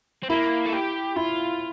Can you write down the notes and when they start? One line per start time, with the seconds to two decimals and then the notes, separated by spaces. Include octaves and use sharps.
0.23 C4
0.30 A#3 E4
0.66 A4
0.73 G4
1.16 E4 F4